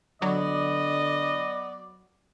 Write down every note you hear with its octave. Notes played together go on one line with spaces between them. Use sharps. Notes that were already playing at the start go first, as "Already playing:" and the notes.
D3 F#3 B3 D5 D#5